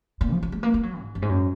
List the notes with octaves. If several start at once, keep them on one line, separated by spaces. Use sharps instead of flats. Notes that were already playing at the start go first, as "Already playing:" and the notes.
A#2
F3
F3
G#3
A#3
A#3
F#3
G#2
F#2
G#2
F#2